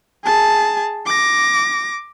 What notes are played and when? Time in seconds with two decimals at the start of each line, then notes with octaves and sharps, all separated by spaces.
0.24 G#4 A5
1.06 D6 A#6